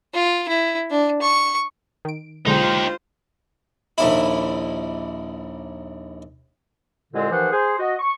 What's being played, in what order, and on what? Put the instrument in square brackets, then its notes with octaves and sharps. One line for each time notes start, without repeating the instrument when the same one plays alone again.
[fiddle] F4
E4
D4
C#6
[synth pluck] D#3 D7
[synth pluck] B1 D3 G#3 [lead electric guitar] D#4 G4 [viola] F4 C5
[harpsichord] A#1 D#2 E4
[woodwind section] C2 A#2 D3 G#3 C4
D#2 E3 F3 C5 F#5
G#4 C5
F#4 D#5
C#6